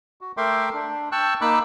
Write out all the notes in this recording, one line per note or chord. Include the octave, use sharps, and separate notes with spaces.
F#4
A3 A#4 E5 G5 C6 D6
D4
G5 A5 C#6 E6 F#6
A#3 D#4 B5 D6 E6 F#6